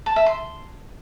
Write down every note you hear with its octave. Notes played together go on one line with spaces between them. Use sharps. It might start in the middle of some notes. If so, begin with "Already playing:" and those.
A5
E5
C6